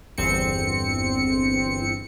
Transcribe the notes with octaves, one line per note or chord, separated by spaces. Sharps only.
G1 E2 C4 C#7